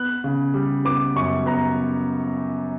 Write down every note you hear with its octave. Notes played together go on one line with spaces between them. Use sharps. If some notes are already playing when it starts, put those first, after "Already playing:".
Already playing: B3 F#6
C#3
G3
B3 D6
F#2 C#6
B3 A#5